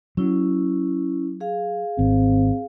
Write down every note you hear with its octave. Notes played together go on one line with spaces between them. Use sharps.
F#3 C#4 E4
G#4 F5
G#1 C4